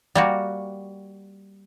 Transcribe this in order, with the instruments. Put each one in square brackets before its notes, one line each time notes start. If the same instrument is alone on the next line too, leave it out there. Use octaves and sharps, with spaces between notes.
[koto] G3 A#3 F#4